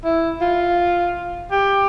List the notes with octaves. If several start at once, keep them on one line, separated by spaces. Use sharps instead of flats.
E4
F4
G4